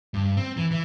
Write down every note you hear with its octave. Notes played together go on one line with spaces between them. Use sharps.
G2
C4
E3
E3